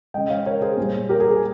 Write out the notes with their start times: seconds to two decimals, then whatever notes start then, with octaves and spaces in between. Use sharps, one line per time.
0.14 C#3 G#3 D#5 G5
0.30 C#5 F5
0.46 A#4 C#5
0.62 G#4 C5
0.77 A#2 G3
1.09 G4 A#4
1.20 G#4
1.31 G#4